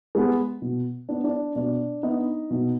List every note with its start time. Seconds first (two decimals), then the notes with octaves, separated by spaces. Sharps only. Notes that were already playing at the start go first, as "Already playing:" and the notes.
0.15 G#3 B3
0.62 B2
1.09 B3 D4
1.24 D4 D5
1.56 B2 D4 D5
2.03 B3 D4 D#4 D#5
2.50 B2